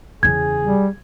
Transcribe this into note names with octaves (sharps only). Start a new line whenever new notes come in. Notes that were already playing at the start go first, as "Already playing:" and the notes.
E2 C#3 G#4 G#6
G3